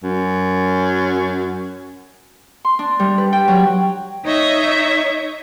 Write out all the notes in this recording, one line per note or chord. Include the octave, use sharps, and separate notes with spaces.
F#2
C6
D4
G3
B4
G5
F#3
D#4 C#5 D#5 E5